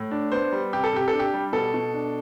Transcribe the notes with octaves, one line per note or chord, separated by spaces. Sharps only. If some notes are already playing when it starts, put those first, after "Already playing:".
Already playing: A2
D4
B3 C5
G3
C3 G4
A4
C3 G4
A4
D4
G4
G3
B2 A4
B2
D4